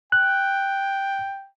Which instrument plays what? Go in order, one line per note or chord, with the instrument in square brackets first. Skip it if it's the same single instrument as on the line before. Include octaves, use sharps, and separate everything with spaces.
[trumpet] G5 [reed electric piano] F#6